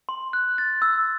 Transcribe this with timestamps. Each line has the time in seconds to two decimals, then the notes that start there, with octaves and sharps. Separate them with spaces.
0.09 C6
0.33 F#6
0.58 A6
0.82 E6